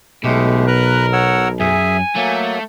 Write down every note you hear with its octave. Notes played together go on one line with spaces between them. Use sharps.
B1 B2 G#3 A3 G4
A#4 B4 A#5 F#6
C#5 F#5 E6
F#2 G#4 E5 G#5
F#3 A3 A#3